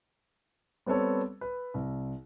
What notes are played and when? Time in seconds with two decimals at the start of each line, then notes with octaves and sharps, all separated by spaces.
0.86 G3 B3 C4 A4 C#5
1.41 B4
1.74 C2